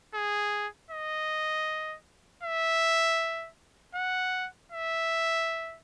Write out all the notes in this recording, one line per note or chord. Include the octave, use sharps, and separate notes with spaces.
G#4
D#5
E5
F#5
E5